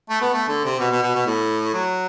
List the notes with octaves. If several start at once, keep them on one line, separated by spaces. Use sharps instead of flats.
A3
B3
A3
D3
C3
B2
B2
B2
B2
A2
F#3